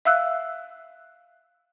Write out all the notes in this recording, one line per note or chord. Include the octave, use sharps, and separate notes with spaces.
E5 F5 E6 F#6